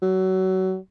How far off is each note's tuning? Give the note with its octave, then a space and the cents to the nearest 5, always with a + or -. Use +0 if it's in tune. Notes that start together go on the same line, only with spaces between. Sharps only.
F#3 +25